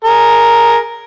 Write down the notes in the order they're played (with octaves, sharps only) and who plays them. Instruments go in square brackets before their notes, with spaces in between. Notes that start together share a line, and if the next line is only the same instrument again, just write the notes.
[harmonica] G#4 A#4